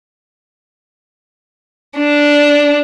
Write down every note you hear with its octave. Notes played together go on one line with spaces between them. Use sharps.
D4